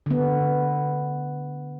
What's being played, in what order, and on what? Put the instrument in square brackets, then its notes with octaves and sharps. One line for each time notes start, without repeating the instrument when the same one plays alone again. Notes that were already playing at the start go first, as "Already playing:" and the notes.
[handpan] D3 B3